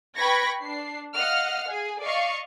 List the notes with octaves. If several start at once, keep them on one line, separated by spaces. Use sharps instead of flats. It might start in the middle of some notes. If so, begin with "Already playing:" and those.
B4 G5 B5 C#6 G#6 A#6
D4 C7
D#5 F5 F#5 F6
G#4
D5 D#5 F5 C#6